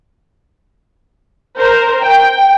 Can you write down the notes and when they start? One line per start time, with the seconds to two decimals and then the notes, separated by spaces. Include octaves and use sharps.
1.57 A#4 C5
2.03 G5